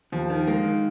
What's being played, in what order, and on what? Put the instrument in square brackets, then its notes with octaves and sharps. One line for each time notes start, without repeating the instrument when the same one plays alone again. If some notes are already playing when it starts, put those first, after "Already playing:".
[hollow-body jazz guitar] D#2 [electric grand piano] F3
[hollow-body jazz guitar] D#3
[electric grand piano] G#3 [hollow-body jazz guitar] A#3
[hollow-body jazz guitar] D#3